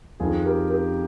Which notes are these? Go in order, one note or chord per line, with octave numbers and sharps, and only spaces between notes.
F2 D#3 F4 G#4
G4 A#4
G4 A#4